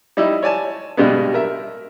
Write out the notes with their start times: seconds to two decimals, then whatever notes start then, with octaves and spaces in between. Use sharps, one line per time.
0.17 G3 D#4 E4
0.43 C#5 D5 G#5 A5
0.97 G2 B2 G3 G#3 B3
1.34 A#4 E5